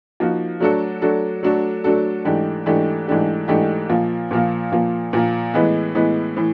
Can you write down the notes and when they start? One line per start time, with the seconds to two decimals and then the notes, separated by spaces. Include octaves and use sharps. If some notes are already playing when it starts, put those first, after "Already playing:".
0.20 F3 A#3 D#4 F#4
0.60 F#3 A3 D4 F#4 A4
1.02 F#3 A3 D4 F#4 A4
1.43 F#3 A3 D4 F#4 A4
1.84 F#3 A3 D4 F#4 A4
2.25 G#2 E3 A3 D4 G4
2.66 G#2 E3 A3 D4 G4
3.07 G#2 E3 A3 D4 G4
3.48 G#2 E3 A3 D4 G4
3.89 A#2 F3 A#3
4.31 A#2 F3 A#3
4.72 A#2 F3 A#3
5.13 A#2 F3 A#3
5.54 A2 E3 G#3 B3
5.95 A2 E3 G#3 B3
6.37 A2 E3